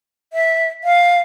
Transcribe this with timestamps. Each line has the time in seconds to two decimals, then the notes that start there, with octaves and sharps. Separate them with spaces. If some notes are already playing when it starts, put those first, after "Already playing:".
0.33 E5
0.84 F5